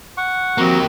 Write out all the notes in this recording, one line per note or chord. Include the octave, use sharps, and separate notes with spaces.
F#5 C#6
F3 A#3 C4 F#4 G4